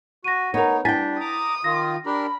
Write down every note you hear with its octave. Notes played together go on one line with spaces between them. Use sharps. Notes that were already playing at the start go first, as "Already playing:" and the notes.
F#4 A#6 D#7
B3 D#4 A#4 C#5
G3 D4 E4 G5 G#5 A6 B6
A#5 D6 D#6
D#3 F4 A#6
D4 G4 A#4 B5